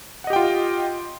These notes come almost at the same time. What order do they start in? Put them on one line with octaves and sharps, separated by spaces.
F#5 D#5 G4 G5 F4